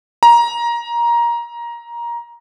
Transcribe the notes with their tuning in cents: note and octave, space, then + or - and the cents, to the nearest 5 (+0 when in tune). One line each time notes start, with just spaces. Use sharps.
A#5 +15